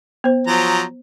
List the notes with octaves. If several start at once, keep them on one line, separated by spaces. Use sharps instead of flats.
B3 C5
F3 F#3 A#5